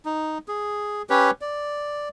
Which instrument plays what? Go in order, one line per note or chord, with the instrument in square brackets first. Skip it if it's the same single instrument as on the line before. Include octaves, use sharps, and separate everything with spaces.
[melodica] D#4
G#4
C#4 G4 B4 C#5
D5